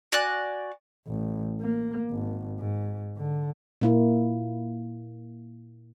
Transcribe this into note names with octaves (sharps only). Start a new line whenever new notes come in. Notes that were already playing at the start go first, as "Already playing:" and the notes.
F#4 D5 G#5 F#6
A1
A#3
G#1
G#2
D3
A#2 A#3 E4